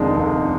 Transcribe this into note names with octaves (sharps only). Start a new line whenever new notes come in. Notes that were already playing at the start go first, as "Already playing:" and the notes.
Already playing: F1 F2 D#3 G#3 D4
F1